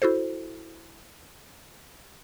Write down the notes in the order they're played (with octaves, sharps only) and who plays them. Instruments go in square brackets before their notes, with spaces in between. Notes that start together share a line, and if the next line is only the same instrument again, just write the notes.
[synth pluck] E4 F#4 A4 C5